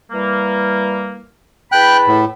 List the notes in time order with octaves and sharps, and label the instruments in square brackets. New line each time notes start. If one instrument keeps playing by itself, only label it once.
[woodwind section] E3 G3 A#3
[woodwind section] E2 A5 B5 [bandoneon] G5 F#6
[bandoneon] A2